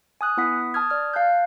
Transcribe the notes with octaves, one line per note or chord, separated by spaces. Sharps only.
G#5 D#6 F#6
B3 E4 F#5 D#6 B6
A5 D#6 F6 G#6
D5 F6
F5 A5 F#6 G6